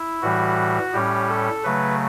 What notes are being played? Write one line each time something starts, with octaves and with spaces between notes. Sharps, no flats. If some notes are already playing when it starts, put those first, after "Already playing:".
Already playing: E4
A2 E3 G3 F#4
A2 G3 C#4 G4
A4
C#3 F#3 A3 B4